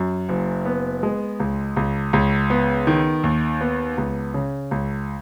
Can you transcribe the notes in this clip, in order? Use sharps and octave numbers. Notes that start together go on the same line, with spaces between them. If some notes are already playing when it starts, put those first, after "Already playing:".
Already playing: F#2
F#1
B3
G#3
C#2
C#2
C#2
B3
D#3
D#2
B3
C#2
C#3
C#2